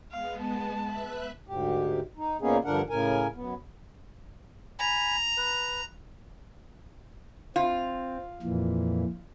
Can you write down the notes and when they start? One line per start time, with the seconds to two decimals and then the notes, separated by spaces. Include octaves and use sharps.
0.12 G#3 B3 F5
0.41 A5
0.84 B4 E5 F#6
1.48 D2 G#2 G4
2.17 D#4
2.41 A#2 A#3 B3 C#4 D#4 G#4
2.65 G2 D3 F3 D4 A#4 F#5
2.90 A2 C#3 A#4 G#5
3.35 F#2 B3
4.79 G#5 A#5 B5
5.37 B4
7.56 C4 F4
8.42 F2 A#2 E3